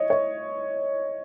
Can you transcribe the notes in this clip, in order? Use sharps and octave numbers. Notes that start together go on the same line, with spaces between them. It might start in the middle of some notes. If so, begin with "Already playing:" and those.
Already playing: C#5 D#5
C#5